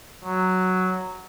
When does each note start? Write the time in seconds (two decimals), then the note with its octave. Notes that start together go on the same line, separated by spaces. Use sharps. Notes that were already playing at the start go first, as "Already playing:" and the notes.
0.24 F#3